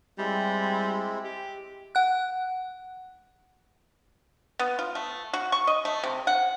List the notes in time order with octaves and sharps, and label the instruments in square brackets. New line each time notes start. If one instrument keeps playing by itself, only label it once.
[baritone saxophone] G3 [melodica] G#3 C4 E4
[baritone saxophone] G4
[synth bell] F#5 F#6
[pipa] B3
F4
A3
F#4
C#6
D#5
A3
C3
F#5